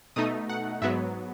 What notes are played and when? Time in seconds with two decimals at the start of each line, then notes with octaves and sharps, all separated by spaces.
0.16 B2 A3 D#4 D#6
0.49 F#5
0.82 G#2 F#3 B3 E5